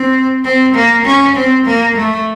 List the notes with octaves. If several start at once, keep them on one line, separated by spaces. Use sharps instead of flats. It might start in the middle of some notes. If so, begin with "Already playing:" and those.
Already playing: C4
C4
A#3
C#4
C4
A#3
A3